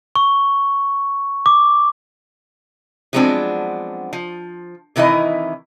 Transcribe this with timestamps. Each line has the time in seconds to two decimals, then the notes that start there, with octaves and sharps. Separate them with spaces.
0.16 C#6
1.46 D6
3.13 F3 F#3 G#3 B3 C4 D4
4.13 F3
4.96 C3 D#3 E3 E4 D#5